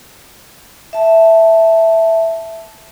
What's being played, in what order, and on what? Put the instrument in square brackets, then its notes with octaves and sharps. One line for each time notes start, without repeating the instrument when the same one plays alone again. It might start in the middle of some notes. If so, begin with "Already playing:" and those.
[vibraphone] E5 A5